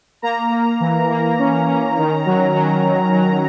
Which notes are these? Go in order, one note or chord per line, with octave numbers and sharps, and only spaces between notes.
A#3 A#5
A#3
E3
A#3
C#4
C#4
D#3
F#3
F#3
D#3
F#3